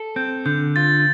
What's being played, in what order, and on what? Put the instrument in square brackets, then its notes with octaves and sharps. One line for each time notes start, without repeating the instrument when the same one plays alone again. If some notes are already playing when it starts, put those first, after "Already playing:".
Already playing: [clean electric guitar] A4
[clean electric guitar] C4 [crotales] G6
[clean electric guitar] D3 [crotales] G6
[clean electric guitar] F4 [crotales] A6